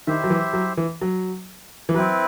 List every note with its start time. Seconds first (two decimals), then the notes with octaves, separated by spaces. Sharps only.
0.07 D#3 E4 G4 C5 E5
0.24 F#3
0.30 E3
0.53 F#3
0.77 E3
1.01 F#3
1.89 E3
1.95 F#3 C4 E4 B4